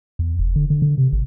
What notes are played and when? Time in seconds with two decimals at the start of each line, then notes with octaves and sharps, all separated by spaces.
0.19 E2
0.39 F1
0.56 D3
0.70 D3
0.82 D3
0.98 C3
1.13 G#1